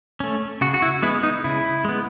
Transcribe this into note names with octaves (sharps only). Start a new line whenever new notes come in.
A3 C#4
C#3 F#4
F#4
E4
G#3 B3 E4
D#4
C#3 E4
G#3 B3